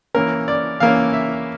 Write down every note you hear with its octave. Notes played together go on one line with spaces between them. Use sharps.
E3 A#3 C#4 A#4
D5
E3 A#3 C#4 F5
E5